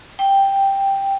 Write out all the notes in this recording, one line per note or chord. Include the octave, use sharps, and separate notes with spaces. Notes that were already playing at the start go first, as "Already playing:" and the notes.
G5